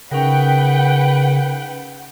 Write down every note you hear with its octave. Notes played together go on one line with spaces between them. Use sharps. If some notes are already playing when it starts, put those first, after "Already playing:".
C#3 C#4 D#4 A#4 B4 F#5 G5